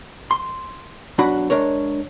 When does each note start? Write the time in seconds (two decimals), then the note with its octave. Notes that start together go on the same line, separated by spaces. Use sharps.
0.31 C6
1.18 B1 D4 F#4 F#5 B5
1.50 G#3 D4 A#4 C#5